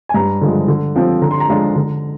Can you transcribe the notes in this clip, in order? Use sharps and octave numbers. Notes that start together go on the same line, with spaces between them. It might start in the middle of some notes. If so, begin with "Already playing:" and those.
G#5
G2 A#5
D3 F3 G#3
D3
F3 C4 F4
D3 A#5
C6
A#5
F3 G#3 D4 F4
D3